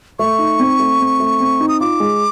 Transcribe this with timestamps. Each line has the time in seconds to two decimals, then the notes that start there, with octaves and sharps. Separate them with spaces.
0.19 A3 C#6
0.39 D#4
0.60 C4
0.79 A3
1.00 C4
1.20 A3
1.40 C4
1.60 D#4
1.69 D#6
1.81 F4 D6
2.00 G#3